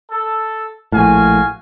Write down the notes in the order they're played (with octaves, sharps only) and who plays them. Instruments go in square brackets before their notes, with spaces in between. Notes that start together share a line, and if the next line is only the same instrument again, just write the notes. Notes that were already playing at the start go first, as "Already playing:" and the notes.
[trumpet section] A4
[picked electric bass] A#1 A2 [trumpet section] F#4 F5 G#5